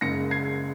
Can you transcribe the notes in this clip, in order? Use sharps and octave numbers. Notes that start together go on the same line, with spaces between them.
F#1 F#2 C#3 G#3 A#6 C#7
G#6 C7